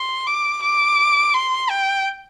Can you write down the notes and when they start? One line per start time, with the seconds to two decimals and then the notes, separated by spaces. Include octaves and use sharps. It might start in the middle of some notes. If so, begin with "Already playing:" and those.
Already playing: C6
0.27 D6
0.62 D6
1.34 C6
1.70 G5